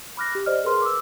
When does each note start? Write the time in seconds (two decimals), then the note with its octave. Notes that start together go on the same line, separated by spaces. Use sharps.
0.17 B5 D6 F6 F#6 A#6
0.35 G4
0.46 C5 D5 D#5 F6
0.64 G#4 A#4 B4 C6 F6
0.82 D6 E6